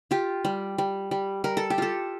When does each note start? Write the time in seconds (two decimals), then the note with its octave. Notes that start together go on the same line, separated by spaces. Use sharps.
0.11 F4 G4
0.45 G3
0.78 G3
1.11 G3
1.44 G3 A#4
1.57 A4
1.70 G4
1.78 F4 A4